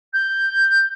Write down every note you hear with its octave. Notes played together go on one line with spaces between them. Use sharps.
G6